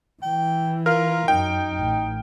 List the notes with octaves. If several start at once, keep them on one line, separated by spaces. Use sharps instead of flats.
E3 G5
F4 A#4 F6
F#2 D#4 G5
A1